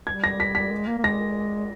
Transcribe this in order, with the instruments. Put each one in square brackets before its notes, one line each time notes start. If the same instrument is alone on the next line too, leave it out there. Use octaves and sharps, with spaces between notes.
[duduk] G3 [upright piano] G#6
[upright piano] A#6
B6
B6
[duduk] G#3
A#3
A#3
[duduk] G#3 [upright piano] A#6